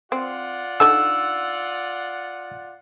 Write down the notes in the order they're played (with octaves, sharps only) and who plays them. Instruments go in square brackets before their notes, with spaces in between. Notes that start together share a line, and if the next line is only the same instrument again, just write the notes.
[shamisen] C4 [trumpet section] F4 D5 F#5
[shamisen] D3 D#4 A4 [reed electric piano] E6